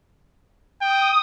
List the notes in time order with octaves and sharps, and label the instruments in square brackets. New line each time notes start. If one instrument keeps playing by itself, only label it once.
[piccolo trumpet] G5 [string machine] D#6